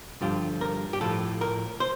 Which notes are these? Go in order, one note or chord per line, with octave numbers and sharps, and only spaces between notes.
G2 D3 F3 G4
A#4
G4
A2 F3 A4
A#4
C5